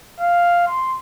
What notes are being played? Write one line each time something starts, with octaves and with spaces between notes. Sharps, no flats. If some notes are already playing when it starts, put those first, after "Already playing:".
F5
C6